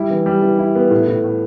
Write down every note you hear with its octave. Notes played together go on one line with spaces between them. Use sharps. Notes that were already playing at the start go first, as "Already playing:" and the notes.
Already playing: G3 E4
E3
G3
E3
E4
B3
A2
A2
A2